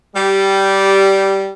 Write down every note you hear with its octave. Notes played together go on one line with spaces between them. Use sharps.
G3 G4